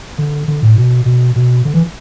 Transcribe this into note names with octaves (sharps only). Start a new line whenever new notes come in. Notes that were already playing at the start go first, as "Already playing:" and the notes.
D3
D3
A2
B2
B2
B2
D3
E3